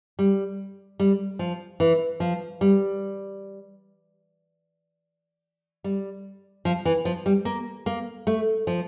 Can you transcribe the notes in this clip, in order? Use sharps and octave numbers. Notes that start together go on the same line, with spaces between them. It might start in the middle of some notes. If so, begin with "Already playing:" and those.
G3
G3
F3
E3
F3
G3
G3
F3
E3
F3
G3
A#3
A#3
A3
F3